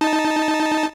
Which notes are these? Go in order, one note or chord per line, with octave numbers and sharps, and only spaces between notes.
D#4 A5